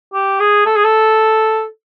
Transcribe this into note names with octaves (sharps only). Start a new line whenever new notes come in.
G4
G#4
A4
G#4
A4